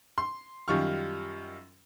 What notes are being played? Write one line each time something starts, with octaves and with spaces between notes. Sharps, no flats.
C6
F#2 D#3 G3 F4 C#6 F6